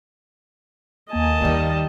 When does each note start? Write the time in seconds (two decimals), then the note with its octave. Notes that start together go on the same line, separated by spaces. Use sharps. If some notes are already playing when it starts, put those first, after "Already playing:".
1.11 D#2 A#3 D#5 G#5 A5
1.41 D#2 D#3 G3 A#3